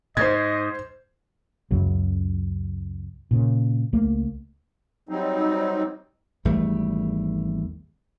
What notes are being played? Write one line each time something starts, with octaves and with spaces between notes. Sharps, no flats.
G#2 C5 D#5 G#6
C#2 F#2 C#3 F#3
A#2 C#3
C#2 A3 A#3
F#3 G3 C4 D#4
G#1 E2 G3 A3